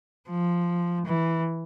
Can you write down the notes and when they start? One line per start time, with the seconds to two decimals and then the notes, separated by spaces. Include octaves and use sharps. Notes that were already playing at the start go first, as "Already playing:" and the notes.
0.29 F3
1.06 E3